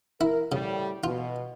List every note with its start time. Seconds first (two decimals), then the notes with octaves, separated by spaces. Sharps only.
0.21 E4 A#4
0.52 A2 C#3 G3
1.04 B2 F4